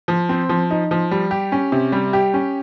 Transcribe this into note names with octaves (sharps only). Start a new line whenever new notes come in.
F3
C4
F3
D#4
F3
G3
G4
C#4
C3
G3
G4
C#4